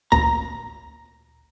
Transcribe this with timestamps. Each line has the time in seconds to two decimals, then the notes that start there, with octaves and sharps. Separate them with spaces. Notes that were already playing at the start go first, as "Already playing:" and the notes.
0.12 A1 D2 A#2 A#5